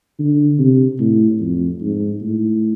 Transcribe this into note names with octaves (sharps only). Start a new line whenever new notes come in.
D3
C3
A2
F2
G#2
A2